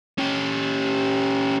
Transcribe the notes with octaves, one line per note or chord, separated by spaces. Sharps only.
C#4 G4